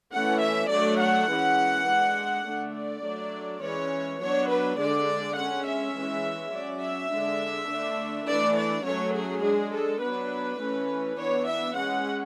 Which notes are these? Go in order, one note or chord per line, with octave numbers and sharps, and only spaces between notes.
E3 A3 C#4 F#5
E5
F#3 A3 D4 D5
F#5
E3 G#3 C#4
G#3 D4
D3 A3 D4
D5
F#3 A3 D4
E3 G#3 C#4 C#5
F#3 B3 D4 C#5
B4
D3 G#3 D4 D5
G#3 C#4 F#5
E5
E3 G#3 C#4
F#3 C#4 D5
E5
D3 G#3 D4
D3 A3 D4
E3 A3 D4 D5
D5
F#3 A3 C#4 C#5
G#4
G#3 D4 G#4
A4
F#3 B3 D4 B4
E3 A3 C#4
E3 B3 D4 C#5
E5
G#3 C#4 F#5